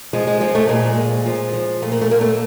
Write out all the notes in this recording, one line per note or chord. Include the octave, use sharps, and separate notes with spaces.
F3 G#3
G#3
F3 G#3
A3
A#2 G#3
A#2
F3
F3
A#2 A3
A#3
A3
A#2 A#3
A3